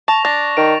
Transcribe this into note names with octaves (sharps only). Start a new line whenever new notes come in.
A5 C#6 A#6 F7
D4 A6 A#6
D#3 D7